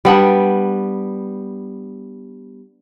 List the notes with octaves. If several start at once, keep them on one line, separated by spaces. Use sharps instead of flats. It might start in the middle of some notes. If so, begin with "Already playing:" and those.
G3 B3 D4